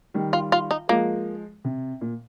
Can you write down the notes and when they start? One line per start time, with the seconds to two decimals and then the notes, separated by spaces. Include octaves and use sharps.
0.14 D#3 G3
0.33 F4
0.52 F4
0.71 D#4
0.89 F3 G#3 A#3
1.64 C3
2.01 A#2